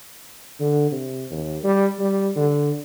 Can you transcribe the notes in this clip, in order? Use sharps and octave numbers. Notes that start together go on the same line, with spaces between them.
D3
C3
D#2
G3
G3
D3